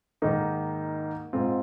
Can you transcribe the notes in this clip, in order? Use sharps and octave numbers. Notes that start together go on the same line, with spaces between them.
G#2 D#3 A#3 D#4
G#2 G#3 C4 F4